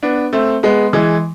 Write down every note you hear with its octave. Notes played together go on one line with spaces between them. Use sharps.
B3 D4
A3 C4
G#3 B3
E3 G#3